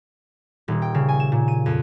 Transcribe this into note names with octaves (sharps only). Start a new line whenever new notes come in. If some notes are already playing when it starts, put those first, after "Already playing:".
D#1
G5
C#3
G#5
E7
A#2
D#7
F2